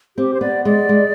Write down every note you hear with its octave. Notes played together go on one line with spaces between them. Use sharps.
C4 G4
C5
B3 D5
G#3 D5
G#3